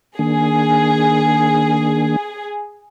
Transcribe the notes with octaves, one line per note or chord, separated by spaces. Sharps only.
D#3 A#3 D4 G#4